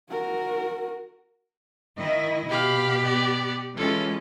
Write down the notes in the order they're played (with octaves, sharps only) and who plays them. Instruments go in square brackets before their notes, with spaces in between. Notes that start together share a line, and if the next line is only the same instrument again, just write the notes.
[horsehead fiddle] F#4 A#4
[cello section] D#3 E4 D#5
[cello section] B2 [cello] G4 [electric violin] F5 B5
[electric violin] B3 D5
[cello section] E3 [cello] G#3 C#4 [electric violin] F4 A4